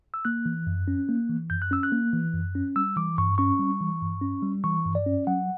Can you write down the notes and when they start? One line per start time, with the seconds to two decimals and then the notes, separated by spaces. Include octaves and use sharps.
0.14 E6
0.25 A#3 F#6
0.46 E3
0.67 F#2
0.88 C#4
1.09 A#3
1.29 E3
1.50 F#2 G6
1.62 F#6
1.71 C#4 E6
1.83 F#6
1.92 A#3
2.13 E3
2.34 F#2
2.55 C#4
2.76 G3 E6
2.96 E3 D6
3.18 G2 C#6
3.38 C#4 C#6
3.59 G3
3.81 E3
4.02 G2
4.22 C#4
4.42 G3
4.64 E3 C#6
4.85 G2
4.95 D5
5.06 C#4
5.27 F#3 F#5